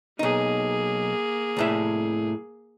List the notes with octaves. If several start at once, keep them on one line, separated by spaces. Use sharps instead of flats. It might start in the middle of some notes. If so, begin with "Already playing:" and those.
B1 A#3 D#4 G#4
C2 A2 E5